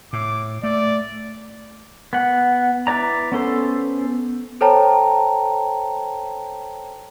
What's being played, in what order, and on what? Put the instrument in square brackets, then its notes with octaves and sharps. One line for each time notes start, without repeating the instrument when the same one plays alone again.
[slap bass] A2 [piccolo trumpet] D6
[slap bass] A3 [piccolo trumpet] D5
[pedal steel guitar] B3 F#5
E4 B4 D5 A#5
B3 C#4 A4 C5
[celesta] A4 C5 C#5 G5 A5 A#5